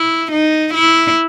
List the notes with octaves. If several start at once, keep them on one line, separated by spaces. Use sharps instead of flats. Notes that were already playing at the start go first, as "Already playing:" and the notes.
Already playing: E4
D#4
E4